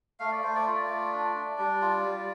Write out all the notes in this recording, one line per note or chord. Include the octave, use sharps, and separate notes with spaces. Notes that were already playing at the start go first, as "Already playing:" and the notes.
A3 F5
D5
A3 C5
D5
F4
A3
D4
D4
G3
F4
G3